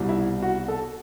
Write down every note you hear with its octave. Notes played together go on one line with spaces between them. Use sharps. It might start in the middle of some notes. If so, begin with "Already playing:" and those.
Already playing: C2 B2 G3
E4
F#4
A4